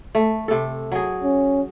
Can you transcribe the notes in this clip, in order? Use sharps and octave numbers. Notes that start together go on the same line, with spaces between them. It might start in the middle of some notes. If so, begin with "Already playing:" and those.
A3
C3 A4
F#3 G#4
C#4